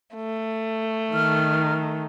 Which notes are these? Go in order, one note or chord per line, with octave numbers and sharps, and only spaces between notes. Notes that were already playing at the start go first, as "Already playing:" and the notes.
A3
D#3 F6